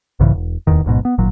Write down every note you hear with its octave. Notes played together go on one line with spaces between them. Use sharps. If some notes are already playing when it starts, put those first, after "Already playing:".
B1 G#2 C#3 E3
E1
D1 E2 D#3
D1 A1 G#2 B2
B3
G#1 A#2 F#3